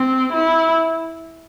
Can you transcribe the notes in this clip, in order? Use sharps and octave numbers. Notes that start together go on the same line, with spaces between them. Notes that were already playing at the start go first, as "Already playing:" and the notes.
Already playing: C4
E4